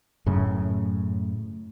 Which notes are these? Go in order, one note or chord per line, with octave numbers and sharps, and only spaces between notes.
F#2 A2 C#3